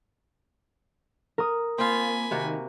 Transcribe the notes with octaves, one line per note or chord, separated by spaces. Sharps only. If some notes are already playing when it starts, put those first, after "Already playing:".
A#4 D#6
A#3 C4 F4 G#5 B5
C3 D#3 A#3 F#4